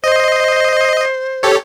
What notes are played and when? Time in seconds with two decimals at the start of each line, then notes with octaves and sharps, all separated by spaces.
0.04 C5 D#5
1.43 G4 A4 C#5